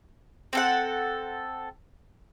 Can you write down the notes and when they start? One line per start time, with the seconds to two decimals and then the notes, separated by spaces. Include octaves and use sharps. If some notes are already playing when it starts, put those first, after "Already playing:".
0.53 C4 A4 F#5